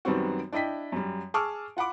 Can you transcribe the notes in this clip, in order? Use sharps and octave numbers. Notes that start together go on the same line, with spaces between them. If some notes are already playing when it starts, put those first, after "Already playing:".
F#2 D#3 G3 B3 C4 F#4
D4 E4 D#5 G5 B6
F#2 G3
G#4 A5 C#6 D6 E6 F6
F4 F#5 B5 D6